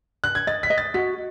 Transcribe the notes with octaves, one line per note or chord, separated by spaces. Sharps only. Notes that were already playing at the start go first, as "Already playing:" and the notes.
F#6
G#6
D#5 A6
B6
D#5
A6
F#4 B6